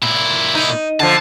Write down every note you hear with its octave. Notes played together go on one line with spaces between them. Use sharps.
A#2 E4
D#4
D3 F3 A5